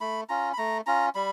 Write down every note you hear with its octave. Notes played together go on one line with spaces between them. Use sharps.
A3 B5
C#4 F4 A#5
B5
A3 A#5
C#4 F4 A#5
G3 B5